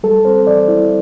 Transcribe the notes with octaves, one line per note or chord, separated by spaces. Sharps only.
G3 A4
C4 C5
E3 D5
G3 E4